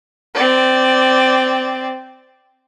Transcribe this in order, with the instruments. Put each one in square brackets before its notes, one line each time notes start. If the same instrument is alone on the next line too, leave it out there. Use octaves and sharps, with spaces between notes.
[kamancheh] C4 D5